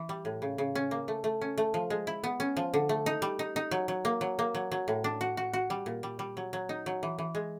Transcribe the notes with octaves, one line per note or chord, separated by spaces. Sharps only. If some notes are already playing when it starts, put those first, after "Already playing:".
Already playing: E3
G3
A2
C#3
C#3
C#4
A#3
A3
A3
C#4
A3
F3
G#3
E4
B3
C#4
F3
D3
A3
D#4
G3
D#4
D#4
F#3
F#3
A#3
F#3
A#3
F#3
F#3
A2
D4
F#4
F#4
F#4
G3
A#2
G3
G3
F#3
F#3
D#4
F#3
E3
E3
G#3